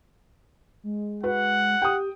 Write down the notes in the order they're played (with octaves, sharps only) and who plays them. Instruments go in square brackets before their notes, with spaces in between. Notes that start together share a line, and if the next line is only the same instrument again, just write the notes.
[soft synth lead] G#3
[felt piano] F#4 B4 [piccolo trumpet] F#5
[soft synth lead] G4 [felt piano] G5 D#6